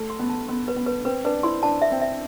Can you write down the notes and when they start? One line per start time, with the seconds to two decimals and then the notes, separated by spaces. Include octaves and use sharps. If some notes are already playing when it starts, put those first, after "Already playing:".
Already playing: A3
0.10 C6
0.19 B3
0.30 A5
0.48 B3 C6
0.68 B4
0.76 B3
0.86 B4
1.05 C4 B4
1.24 D4 B4
1.43 E4 C6
1.63 D4 A5
1.82 E5
1.92 C4
2.01 E5